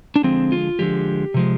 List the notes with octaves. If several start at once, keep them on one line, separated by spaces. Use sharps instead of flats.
D4
D3 F3 G#3 C4
F4
D3 F3 G#3 G4
C3 F3 G#3